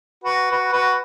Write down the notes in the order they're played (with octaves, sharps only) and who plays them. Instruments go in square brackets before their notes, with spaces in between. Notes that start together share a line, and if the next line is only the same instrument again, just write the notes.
[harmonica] F#4 B4
F#4 B4
F#4 B4